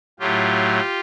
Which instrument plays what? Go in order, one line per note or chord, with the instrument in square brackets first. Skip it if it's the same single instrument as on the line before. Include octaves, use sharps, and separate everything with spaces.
[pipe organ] A2 F#3 A3 F4 G4